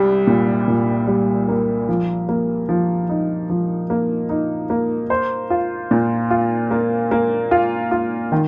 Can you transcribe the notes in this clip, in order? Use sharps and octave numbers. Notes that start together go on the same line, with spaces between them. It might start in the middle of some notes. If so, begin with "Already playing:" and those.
Already playing: C2 G3
A#2
A#2
G3
A#3
F3
A#3
F3
D#4
F3
A#3
D#4
A#3
C5
F4
A#2
F4
A#3
A#3
F4
F4
D#3